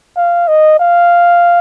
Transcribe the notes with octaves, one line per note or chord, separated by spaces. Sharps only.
F5
D#5
F5